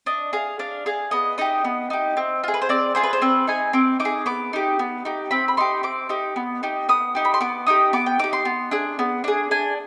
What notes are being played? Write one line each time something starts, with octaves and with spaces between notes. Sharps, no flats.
D4 D#5
G#4 F5
D4 F5
G#4 F5
B3 D#5
D#4 G4 D#5
B3
D#4 G4
C4
F4 G#4
B4
C5
C4 D5
F4 G#4 C5
B4
C5
C4 B4
D#4 G#4 G#5
C4 D6
D#4 D6
G#4
B3 D6
D#4 G4
B3
D#4 G4
C4 B5
B5
D#4 G4 C6
C4 D6
D#4 G4
B3
D#4 G4
B3 D#6
D#4 G4
B5
C6
B3 D6
D#4 G4 D#6
B3 D6
G5
D#4 G4 D6
C6
B3
D4 G#4
B3
D4 G#4
D4 G#5